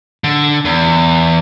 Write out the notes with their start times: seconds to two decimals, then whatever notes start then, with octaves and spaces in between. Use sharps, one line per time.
0.24 D3
0.65 E2